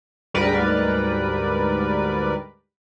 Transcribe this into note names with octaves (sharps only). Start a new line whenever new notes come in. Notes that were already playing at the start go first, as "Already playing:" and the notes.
D2 G#2 G3 A#4 B4 D5